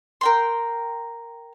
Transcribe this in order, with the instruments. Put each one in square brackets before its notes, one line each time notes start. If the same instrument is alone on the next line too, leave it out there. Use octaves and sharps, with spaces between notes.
[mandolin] A#4 G5 C6